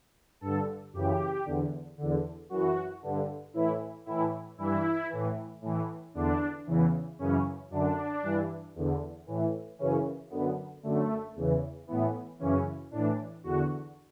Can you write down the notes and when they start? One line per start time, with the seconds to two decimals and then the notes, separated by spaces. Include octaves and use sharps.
0.41 G2 D3 A4
0.93 F#2 C#3 E3 G4
1.45 E2 D3
1.98 E2 D3
2.50 F#2 E3 F#4
3.02 G2 D3
3.54 A2 E3 E4
4.06 A2 E3 E4
4.58 G2 E3 E4
5.10 A2 E3
5.62 A2 E3
6.14 E2 D3 D4
6.67 E2 C#3 E3
7.19 F#2 C#3 E3 C#4
7.70 F#2 D3 D4
8.23 G2 E3
8.75 E2 D3
9.27 A2 E3
9.79 F#2 C#3 E3 C#4
10.31 F#2 D3 B3
10.83 F#2 D3 A3
11.35 E2 C#3 E3
11.87 A2 E3 B3
12.39 F#2 C#3 E3 C#4
12.91 A2 E3 D4
13.44 E2 D3 F#4